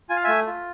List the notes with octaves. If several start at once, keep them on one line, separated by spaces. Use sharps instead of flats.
F4 G#5
F5
A3 E5 G#5
F4